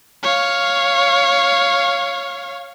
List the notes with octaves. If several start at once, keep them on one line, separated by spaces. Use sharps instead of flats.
C#5 F5